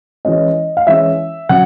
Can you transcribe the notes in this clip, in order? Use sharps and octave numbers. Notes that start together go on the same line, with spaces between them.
E3 G#3 C#4 D#5
F5
E3 G#3 C#4 E5
C#3 F#3 F#5